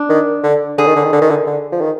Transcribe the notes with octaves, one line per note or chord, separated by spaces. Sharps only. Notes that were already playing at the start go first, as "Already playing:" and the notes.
Already playing: D4
D#3
D3
D3 G#4
D#3
D3
D#3
D3
D#3
D3
D3
F3
D#3